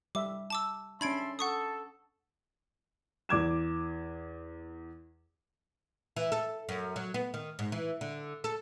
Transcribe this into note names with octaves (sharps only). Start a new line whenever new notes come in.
G3 E5 D6
A5 D6 E6
C#4 D4 E5 A5 B5 C6 G#6 D7
A4 F#5 C#6 D#6
E2 D6 G#6 E7
E3
A4
F#2
F#3
B3
D#3
G#2
E3
D3
A4